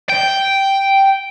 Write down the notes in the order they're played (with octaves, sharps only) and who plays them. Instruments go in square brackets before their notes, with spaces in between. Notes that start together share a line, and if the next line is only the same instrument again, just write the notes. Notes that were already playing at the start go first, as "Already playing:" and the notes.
[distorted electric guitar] G5